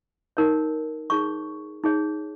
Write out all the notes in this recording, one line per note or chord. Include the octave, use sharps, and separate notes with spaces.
D#4 A#4 C#5
D#4 G#4 C#5 C#6
D#4 G#4 C#5